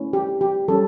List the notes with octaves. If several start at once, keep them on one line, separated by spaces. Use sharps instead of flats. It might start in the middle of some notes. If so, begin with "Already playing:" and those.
Already playing: A3 C#4 E4
G4
G4
G3 C#4 G4 A4